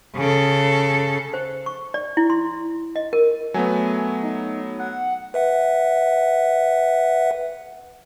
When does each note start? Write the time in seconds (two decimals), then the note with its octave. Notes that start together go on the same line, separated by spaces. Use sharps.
0.15 C#3 A4
1.34 C5
1.66 C#6
1.94 D5
2.17 E4
2.30 C6
2.96 D#5
3.13 A#4
3.54 F#3 A3 B3 G#5
4.23 D#4
4.79 F#5
5.34 B4 E5 F#5